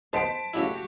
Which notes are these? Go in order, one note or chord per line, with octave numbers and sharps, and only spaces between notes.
D#3 B3 C5 A5 B6 D7
A2 C#3 E4 F#4 G4